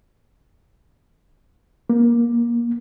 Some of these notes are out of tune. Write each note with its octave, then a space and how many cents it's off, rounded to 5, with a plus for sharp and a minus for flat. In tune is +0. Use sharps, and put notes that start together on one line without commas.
A#3 +20